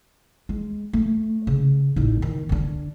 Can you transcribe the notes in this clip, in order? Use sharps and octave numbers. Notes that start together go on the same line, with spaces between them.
G#3
A3
C#3
A1 D#4
D#3
D3 D4